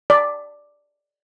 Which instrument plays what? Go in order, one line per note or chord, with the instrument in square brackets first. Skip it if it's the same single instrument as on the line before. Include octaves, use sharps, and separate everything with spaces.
[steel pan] D5